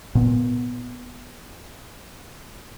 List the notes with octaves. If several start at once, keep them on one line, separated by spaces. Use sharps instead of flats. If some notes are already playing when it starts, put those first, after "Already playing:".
A#2 B3